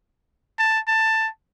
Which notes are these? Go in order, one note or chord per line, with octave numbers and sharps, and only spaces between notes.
A5
A5